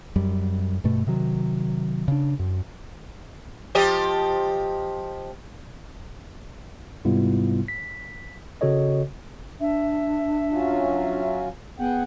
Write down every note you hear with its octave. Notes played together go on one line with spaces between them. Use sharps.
F#2 G3
G2 B2 A3
C3 D#3 F#3
C#3 D4
F#2
F3 G4 D#5
G#2 C3 G3 B3 E4 F4
B6
C#3 F#4 A4 C#5 D#5
D4 E5
F#3 C#4 F4
B3 G#4 F#5 G5